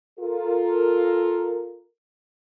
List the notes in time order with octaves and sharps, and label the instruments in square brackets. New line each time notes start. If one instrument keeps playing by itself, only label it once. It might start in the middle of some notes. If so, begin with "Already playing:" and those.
[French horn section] F4 A4 A#4